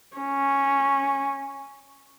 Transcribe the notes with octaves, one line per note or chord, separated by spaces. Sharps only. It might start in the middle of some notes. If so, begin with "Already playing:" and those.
C#4